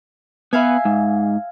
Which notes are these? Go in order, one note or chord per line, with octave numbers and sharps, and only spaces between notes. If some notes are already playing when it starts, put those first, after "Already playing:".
B3 B4 E5 F5 G#5
G#2